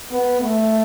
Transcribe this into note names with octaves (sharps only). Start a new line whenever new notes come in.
B3
A3